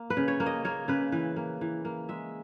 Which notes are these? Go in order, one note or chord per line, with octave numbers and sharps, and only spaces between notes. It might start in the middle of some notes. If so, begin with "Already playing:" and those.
Already playing: A#3
B4
C#3
C#5
A#3
D#5
A#3 C#5
C#3 B4
E3 B4
A#3
E3
A#3
G#3 E5